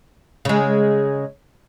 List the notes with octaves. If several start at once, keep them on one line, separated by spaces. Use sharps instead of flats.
C#3 G#3